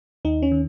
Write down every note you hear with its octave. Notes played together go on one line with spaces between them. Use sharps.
D#2 D#4
C#4
D#3